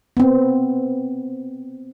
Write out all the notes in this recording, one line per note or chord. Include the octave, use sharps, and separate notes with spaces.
B3 C4